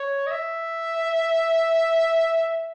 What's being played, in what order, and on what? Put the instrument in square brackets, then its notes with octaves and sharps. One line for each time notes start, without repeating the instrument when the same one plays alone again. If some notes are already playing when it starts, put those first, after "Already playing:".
Already playing: [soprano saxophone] C#5
D#5
E5